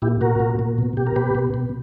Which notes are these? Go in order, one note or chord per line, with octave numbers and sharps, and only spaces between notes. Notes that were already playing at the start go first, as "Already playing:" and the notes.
A#2 E4 G4
A#2 F#4 A#4
A#2
A#2
B2
B2 G4
A#4
B2 G4 B4
B2
B2